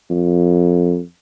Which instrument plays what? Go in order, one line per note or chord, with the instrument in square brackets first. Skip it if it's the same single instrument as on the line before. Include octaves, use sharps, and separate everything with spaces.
[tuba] F2